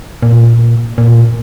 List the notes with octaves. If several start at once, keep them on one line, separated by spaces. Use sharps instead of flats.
A#2
A#2